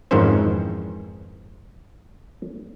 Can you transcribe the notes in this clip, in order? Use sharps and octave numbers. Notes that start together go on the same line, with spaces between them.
F2 G#2 D#3 E3 C#4 C5